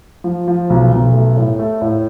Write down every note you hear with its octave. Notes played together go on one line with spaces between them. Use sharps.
F3
F3
B1
B1
A3
A2
A3
A2